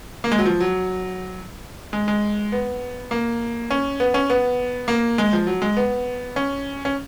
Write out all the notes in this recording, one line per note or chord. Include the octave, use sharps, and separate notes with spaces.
A#3
G#3
F#3
F3
F#3
G#3
G#3
B3
A#3
C#4
B3
C#4
B3
A#3
G#3
F3
F#3
G#3
B3
C#4
C#4